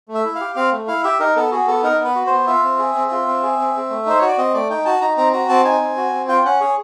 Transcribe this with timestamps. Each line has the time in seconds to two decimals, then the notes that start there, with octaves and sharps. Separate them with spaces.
0.08 A3
0.15 E5
0.25 E4
0.35 F5
0.41 G4
0.56 C4 F5
0.72 A3
0.88 E4 F5
1.04 G4 E5
1.20 D#4 A#4
1.36 B3 A4
1.51 F#4 G#4
1.67 B3 A4
1.83 D#4 A#4
1.99 B3 B4
2.16 F#4
2.27 B3 C5
2.47 F4 E5
2.64 C4
2.79 G#4
2.95 C4
3.11 F4
3.27 C4
3.43 G#4
3.59 C4
3.74 C4
3.90 A3
4.06 D#4 C5
4.19 F#4 C#5
4.28 D5
4.38 C4 D#5
4.54 A3 D5
4.70 D#4 G5
4.85 F#4 A5
5.01 D#4 A#5
5.17 C4 A#5
5.33 F#4 A#5
5.49 C4 A5
5.65 D#4 G#5
5.81 C4
5.97 F#4
6.13 C4
6.28 F4 G5
6.45 C#4 F#5
6.61 G#4 C#5